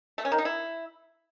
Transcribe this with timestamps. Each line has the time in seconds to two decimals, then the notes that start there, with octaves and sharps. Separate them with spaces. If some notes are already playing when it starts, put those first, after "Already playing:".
0.18 A3
0.25 C#4
0.32 D#3
0.38 D#4
0.45 E4